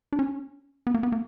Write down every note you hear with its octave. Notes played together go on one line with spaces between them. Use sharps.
D4
C#4
B3
A#3
B3
A#3